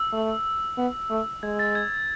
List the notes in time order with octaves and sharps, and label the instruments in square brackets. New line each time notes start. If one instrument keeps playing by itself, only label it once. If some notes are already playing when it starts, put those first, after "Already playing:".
Already playing: [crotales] E6
[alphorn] A3
B3
A3
[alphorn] G#3 [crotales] G#6
[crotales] A6
A6
G#6